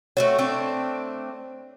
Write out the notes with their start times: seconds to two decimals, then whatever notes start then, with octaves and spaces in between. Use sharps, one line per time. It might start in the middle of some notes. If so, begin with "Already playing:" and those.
0.17 A3 C4 F#4 C#5
0.39 A3 C4 D4